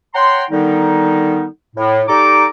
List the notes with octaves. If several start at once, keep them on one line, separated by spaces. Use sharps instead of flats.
C#5 F#5 G5 A#5 C6
D3 D#3 G3 B3 D#4
A2
G3 D#4 G4 A4 A#5 D6